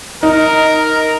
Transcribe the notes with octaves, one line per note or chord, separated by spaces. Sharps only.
D#4 A#4